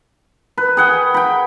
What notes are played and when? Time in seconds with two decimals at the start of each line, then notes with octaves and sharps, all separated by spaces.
0.58 B4
0.77 G#4 F#5 G5
1.14 G5 B5